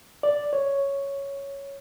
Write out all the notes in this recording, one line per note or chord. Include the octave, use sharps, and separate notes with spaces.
D5
C#5